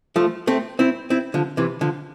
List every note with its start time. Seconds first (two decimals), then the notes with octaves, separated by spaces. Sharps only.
0.16 F3 A3
0.47 A3 C4
0.79 C4 E4
1.10 C4 E4
1.34 D3 F3
1.57 C3 E3
1.81 D3 F3